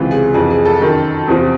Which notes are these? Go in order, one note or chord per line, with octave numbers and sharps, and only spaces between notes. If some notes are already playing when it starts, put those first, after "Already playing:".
Already playing: C#2 C3 E3
G#4
F2 C3 E3 G#4
G#4
A4
F#2 D#3
E2 C3 F3